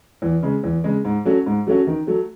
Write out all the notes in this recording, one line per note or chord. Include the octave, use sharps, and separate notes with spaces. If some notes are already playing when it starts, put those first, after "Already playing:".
E2
C#3 G#3
E2
C#3 G#3
G#2
F#3 A3 C#4 F#4
G#2
F#3 A3 C#4 F#4
D#3
F#3 A3